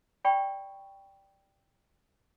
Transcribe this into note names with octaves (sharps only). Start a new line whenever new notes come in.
D5 G5 B5 C#6